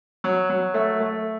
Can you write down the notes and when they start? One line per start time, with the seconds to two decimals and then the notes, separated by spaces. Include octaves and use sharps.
0.24 F#3
0.50 F#3
0.74 A3
1.00 A3